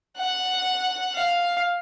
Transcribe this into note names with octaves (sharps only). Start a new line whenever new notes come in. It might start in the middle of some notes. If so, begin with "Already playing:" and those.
F#5
F5